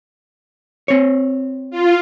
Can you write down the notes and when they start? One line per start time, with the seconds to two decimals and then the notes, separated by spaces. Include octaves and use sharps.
0.88 C4 C#5
1.71 F4